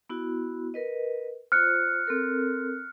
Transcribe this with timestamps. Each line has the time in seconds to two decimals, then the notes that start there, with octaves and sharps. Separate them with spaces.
0.09 B3 E4 F#4
0.74 A#4 B4 D#5
1.52 F4 C5 F6 F#6 C#7
2.07 C4 A4 A#4